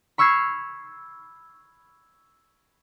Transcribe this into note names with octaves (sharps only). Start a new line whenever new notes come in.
B5 C#6 E6 F6 G#6 C7